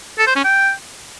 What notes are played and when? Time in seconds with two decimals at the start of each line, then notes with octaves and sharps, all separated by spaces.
0.18 A4
0.27 C5
0.36 C#4
0.44 G5